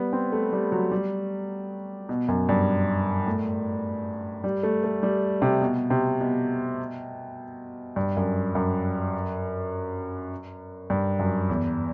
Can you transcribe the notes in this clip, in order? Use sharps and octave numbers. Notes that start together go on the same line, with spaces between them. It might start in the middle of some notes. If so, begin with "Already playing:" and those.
Already playing: G3 B3
C4
A3
G3
F#3
G3
B2
F#2
G2
A2
G3
A3
A3
G3
C3
B2
C3
B2
G2
F#2
F#2
G2
F#2
E2